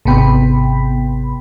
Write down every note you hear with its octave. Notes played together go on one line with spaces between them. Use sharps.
G#1 C3 B3 G5 B5